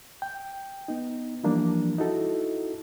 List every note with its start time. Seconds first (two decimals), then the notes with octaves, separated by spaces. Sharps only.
0.22 G5
0.88 B3 D#4
1.44 E3 F3 G3 A#3 D4
1.98 D#4 E4 F#4 A4